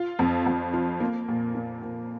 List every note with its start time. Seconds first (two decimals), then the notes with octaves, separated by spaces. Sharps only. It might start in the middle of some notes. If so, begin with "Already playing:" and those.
Already playing: F4
0.19 F2
0.46 F2
0.73 F4
1.00 A#3
1.28 A#2
1.55 A#3
1.82 A#2